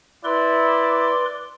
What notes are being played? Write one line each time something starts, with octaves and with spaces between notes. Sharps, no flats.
E4 B4 D5 C6